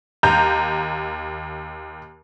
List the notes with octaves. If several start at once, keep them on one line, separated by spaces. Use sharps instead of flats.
D#2 A#5 G6